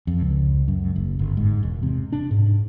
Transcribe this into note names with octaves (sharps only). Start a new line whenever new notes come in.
F2
C#2
F#2
F#1
G1
G#2
E1
C3
D4
G#2